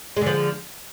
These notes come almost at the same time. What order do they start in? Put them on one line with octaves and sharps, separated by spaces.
G#3 D3 F3